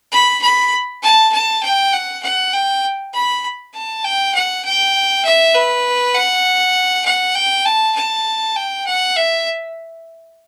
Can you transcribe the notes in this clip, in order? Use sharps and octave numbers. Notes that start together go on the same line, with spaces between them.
B5
B5
A5
A5
G5
F#5
F#5
G5
B5
A5
G5
F#5
G5
E5
B4
F#5
F#5
G5
A5
A5
G5
F#5
E5